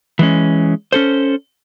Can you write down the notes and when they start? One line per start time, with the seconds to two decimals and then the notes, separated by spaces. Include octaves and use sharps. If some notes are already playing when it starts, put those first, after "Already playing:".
0.19 E3 G#3 C#4
0.92 C#4 A4 C5